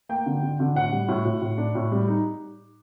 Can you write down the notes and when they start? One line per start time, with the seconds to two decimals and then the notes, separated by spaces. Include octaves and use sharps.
0.09 A#3 G5
0.26 D3
0.43 D3
0.60 D3
0.75 A2 F#5
0.92 G3
1.09 A2
1.25 A2
1.42 A2
1.58 D4
1.75 A2
1.92 G3
2.08 D#4